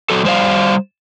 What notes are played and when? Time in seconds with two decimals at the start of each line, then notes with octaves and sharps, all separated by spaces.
0.10 F#3 A4
0.25 G3 C5 D5 F5